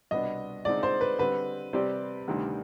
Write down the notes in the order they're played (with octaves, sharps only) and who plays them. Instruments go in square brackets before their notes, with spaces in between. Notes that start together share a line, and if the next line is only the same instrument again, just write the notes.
[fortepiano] C2 B2 B3 D4 [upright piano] D#5
[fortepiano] D3 G#3 C4 D#4 [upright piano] D5
[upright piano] C5
B4
[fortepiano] D3 G3 C4 [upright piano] B4
[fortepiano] C3 G3 C4 G4 D5
D2 C3 D#3 G3 D4